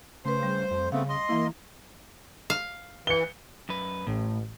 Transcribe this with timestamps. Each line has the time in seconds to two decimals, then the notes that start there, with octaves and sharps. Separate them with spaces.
0.25 C#3 A3 B4 C5
0.43 G3
0.71 F2
0.92 C#3 A3 B3 C4 F5
1.09 D#5 C6
1.29 E3 A#3 E4
2.50 F5
3.07 E3 C#7 G7
3.69 F#2 B4
4.07 A1 A2